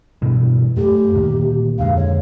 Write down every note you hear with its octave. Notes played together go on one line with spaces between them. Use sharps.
G2 B2 E3
F#2 A3 G4
D2 A#2 D#3
F2 D3 G#3 F5
C#5